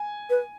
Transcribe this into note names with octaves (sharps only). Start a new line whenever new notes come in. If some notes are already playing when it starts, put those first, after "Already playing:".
Already playing: G#5
B4